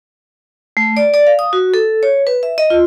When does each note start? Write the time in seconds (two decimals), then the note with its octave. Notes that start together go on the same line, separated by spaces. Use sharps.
0.77 A3
0.97 D5
1.14 D5
1.27 F5
1.39 D#6
1.53 F#4
1.74 A4
2.03 C#5
2.27 B4
2.43 E5
2.58 D#5
2.70 F4